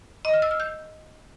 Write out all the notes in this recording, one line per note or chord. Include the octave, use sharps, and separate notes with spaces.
D#5
F6
E6
F6
G6